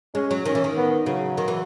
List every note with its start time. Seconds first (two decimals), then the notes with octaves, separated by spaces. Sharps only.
0.15 G#3 C#4
0.31 F#3
0.45 D#3 C#4
0.55 E3
0.64 D#3
0.76 B3
1.06 C#3 F#3
1.37 D#3
1.48 E3